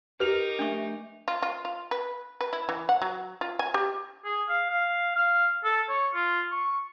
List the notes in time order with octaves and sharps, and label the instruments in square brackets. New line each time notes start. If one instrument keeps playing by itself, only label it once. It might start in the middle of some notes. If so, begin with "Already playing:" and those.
[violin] D#4 A#4 [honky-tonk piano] G4 F7 [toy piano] B4
[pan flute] A3 [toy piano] D4 C#6
[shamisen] F4
F4
F4
B4
B4
E4
E3
F#5
F#3
F4
G#5
G4
[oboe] G#4
F5
F5
F5
A4
C#5
F4
C#6